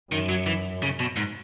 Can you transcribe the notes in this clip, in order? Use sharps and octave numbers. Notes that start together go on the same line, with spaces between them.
F#2 D#3
F#3
E3
C#3
B2
G#2